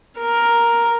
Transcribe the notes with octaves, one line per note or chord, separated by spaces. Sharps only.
A#4